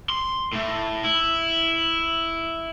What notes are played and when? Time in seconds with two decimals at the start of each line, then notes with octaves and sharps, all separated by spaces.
0.10 C6
0.53 A2 A3
1.04 E4